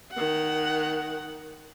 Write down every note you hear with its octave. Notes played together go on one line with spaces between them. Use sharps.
D#3 F#5